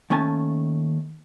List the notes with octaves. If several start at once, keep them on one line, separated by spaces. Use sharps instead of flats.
D#2 A3 C#4 G#5 A5